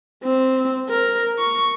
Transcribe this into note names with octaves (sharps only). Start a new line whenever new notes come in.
C4
A#4
C#6